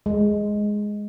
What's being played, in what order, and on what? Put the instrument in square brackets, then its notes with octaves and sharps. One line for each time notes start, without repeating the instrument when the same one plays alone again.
[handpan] G#3